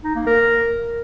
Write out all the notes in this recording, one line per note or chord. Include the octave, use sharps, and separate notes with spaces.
D#4
A#3
A#4